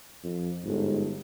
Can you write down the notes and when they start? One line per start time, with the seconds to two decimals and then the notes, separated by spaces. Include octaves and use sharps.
0.24 F2
0.65 G1 G#2